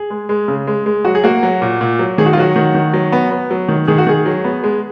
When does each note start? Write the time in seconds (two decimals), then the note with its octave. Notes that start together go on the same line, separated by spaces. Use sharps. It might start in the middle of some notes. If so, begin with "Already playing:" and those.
Already playing: G#4
0.10 G#3
0.29 G#3
0.48 C#3
0.67 G#3
0.86 G#3
1.05 F#3 F#4
1.15 G#4
1.24 A#3 F#4
1.43 F#3
1.62 A#2
1.81 A#2
1.99 F#3
2.18 D#3 G#4
2.26 F#4
2.33 F4
2.37 F#3 F#4
2.56 D#3
2.75 D#3
2.94 F#3
3.12 B3
3.31 B3
3.51 F#3
3.68 D#3
3.87 D#3 G#4
3.98 F#4
4.07 D#3 G#4
4.26 F#3
4.45 B3
4.64 G#3